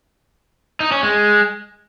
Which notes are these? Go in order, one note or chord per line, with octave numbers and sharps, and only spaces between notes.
D#4
C#4
G#3